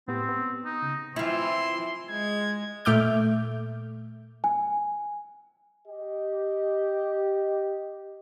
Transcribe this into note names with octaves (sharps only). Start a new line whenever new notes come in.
A2 B3 C4 G4
B3
D#4
C#3
E3 C4 E4 F4 C6
G#3 G#6
A#2 A3 E5 D6 F6 G6
G#5
G4 D#5